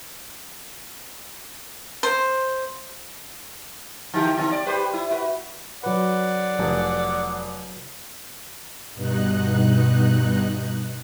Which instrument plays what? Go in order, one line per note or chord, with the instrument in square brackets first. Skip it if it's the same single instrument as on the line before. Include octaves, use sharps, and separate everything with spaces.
[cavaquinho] C5
[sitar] D3 E3 G4
D3 C4
D5
G4 B4 C5
E4
F#4 B4
[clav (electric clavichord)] F#3 B4 [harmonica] D5 F#5
[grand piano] F1
[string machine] G2 B2 D#4 F#6